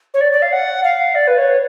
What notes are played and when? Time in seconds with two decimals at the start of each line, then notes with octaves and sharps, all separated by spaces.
0.14 C#5
0.21 D5
0.32 D5
0.42 F5
0.52 F#5
0.83 F5
1.15 D5
1.27 B4
1.38 C#5